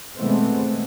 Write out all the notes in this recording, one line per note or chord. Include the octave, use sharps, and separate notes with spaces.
B2 E3 G#3 A3 B3 C4